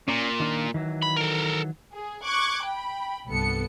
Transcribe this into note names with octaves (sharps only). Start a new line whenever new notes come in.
A#2 C#4 D5 A#5
D#3 D4 F4
D#3 E3 F#3
B5
A4 A#4
G#4
C#6 D6 F#6 G#6
G5 B5
C2 G2 B3 A4 C#7